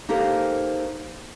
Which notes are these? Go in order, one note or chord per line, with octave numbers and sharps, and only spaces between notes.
A#3 D#4 G4 A4 A#4 C5